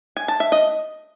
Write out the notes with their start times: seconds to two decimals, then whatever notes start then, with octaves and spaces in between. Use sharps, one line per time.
0.17 G#5
0.28 A5
0.40 E5
0.52 D#5